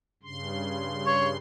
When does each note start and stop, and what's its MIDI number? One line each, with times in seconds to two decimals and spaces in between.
0.23 1.37 43
0.23 1.37 49
0.23 1.37 84
1.07 1.27 73